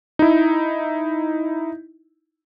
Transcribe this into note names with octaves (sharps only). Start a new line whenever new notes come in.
D#4 E4